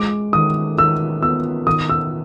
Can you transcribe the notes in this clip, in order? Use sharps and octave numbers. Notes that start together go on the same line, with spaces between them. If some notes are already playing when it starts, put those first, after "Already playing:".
Already playing: G#3 D6
D#3 D#6
D#3 E6
B3 E6
D#3 D#6
E6